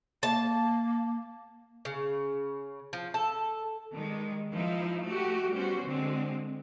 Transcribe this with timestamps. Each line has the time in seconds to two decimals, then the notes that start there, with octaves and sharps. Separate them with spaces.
0.23 A#3 A5
1.85 C#3
2.93 F3
3.14 A4
3.93 D#3 G3 G#3
4.52 F3 D#4 E4
5.05 A3 F#4 G4
5.52 G3 B3 C#4 F#4 C5
5.87 D3 G#3 C4